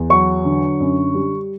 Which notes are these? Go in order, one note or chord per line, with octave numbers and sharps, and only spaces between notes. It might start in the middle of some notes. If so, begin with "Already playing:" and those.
Already playing: E2
F#3 C#6
D3
F#2
G3